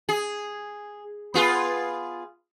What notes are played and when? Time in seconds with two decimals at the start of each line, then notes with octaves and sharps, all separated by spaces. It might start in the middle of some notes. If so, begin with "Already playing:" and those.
0.09 G#4
1.34 B3 F4 G#4